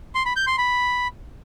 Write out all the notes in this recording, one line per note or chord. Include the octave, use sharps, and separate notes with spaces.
C6
B5
G6
C6
B5